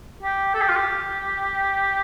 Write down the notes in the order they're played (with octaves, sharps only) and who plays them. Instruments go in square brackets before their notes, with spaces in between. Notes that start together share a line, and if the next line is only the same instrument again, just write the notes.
[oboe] G4
A4
G4
F4
G4